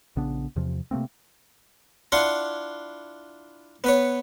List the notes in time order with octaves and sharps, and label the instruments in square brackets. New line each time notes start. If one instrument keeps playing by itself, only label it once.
[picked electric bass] A#1 C#3 B3 D4
E2 C3 F3
C3 A3 A#3 C4
[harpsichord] D4 E4 F4 F#5 C6 C#6
B3 B4 C#5